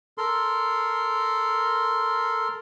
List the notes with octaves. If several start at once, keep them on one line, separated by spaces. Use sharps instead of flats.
A4 A#4 C6